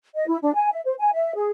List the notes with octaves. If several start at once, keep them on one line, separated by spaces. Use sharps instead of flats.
D#5
E4
D4
G#5
E5
C5
G#5
E5
G#4